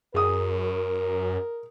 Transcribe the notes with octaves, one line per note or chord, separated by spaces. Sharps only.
F#2 G#4 A#4 D#6